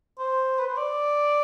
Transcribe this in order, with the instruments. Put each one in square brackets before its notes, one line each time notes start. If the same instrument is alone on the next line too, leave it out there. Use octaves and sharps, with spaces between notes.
[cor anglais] C5
B4
C5
D5